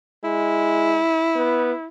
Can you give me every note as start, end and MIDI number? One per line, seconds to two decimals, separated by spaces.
0.24 1.01 56
0.24 1.87 64
1.36 1.72 59